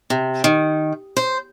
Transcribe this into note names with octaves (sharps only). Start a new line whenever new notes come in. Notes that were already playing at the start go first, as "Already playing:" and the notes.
C3
D#3
C5